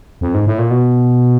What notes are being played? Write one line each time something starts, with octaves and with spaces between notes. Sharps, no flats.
F2
G#2
A2
A#2
B2